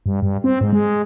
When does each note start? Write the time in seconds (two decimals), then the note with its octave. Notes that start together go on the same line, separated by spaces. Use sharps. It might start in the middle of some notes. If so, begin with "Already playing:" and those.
0.06 G2
0.22 G2
0.44 C4
0.61 G#2
0.73 G#3